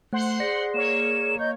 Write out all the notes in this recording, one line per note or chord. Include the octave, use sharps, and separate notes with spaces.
A3 C5 F#5 C6
G#4 D5 A#6 C#7
A#3 C#5 E7
D#5 G6